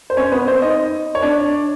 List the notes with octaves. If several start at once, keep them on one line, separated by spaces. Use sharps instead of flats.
C5
C#4 C#5
B3 B4
C4 C5
D#4 D#5
C#5
D4 D5